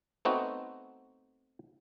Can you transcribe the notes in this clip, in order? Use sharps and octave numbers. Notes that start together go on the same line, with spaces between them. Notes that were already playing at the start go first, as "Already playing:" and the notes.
A3 B3 C4 D#4 F#4